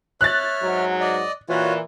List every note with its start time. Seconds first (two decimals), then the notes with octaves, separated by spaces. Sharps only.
0.21 C#5 E5 F6 F#6 A6
0.62 G#2 F#3
1.01 D5 D#5
1.49 A#2 E3 F4 F#4 C#5